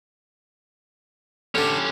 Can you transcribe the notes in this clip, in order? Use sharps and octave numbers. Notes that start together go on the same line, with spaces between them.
D3 C#4 D4 G4